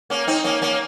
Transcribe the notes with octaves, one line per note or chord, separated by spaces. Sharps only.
A#3 C#4
C4 D#4
A#3 C#4
A#3 C#4